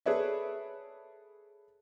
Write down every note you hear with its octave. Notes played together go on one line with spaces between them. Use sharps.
G#4 A4 B4 C#5 D5 E5